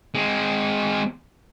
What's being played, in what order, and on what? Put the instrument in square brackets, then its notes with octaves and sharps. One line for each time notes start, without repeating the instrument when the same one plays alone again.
[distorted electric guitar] G#3 C4